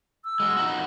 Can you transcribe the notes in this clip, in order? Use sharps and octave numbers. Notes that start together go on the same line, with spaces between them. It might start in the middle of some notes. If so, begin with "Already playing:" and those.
E6
F#3 G#3
F2 D#4 F#4